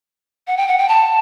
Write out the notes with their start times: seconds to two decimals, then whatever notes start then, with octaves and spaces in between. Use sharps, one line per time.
0.47 F#5
0.57 G5
0.68 F#5
0.78 G5
0.88 A5